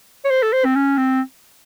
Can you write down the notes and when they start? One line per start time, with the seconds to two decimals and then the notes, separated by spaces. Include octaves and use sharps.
0.25 C#5
0.31 C5
0.42 A4
0.53 C5
0.65 C4
0.76 C#4
0.97 C4